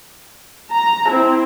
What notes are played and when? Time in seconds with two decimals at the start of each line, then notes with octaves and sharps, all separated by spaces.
0.72 A#5
1.10 C4 E4